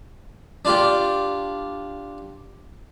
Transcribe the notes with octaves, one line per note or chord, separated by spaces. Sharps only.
D4 F4 G4